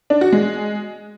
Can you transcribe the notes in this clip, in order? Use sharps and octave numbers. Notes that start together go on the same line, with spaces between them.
D4
F#4
G#3